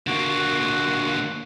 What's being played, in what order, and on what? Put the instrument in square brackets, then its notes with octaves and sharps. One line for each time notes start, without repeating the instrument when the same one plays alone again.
[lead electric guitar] D3 A#3 [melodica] F#4